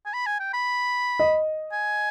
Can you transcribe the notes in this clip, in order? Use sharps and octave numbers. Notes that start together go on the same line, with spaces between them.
G#5
B5
G#5
G5
B5
D#5
G#5